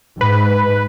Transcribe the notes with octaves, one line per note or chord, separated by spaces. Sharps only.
G#2 B4